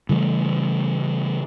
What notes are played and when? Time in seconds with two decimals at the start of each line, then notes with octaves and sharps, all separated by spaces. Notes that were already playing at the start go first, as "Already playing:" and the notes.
0.09 C#3 E3 G3 A3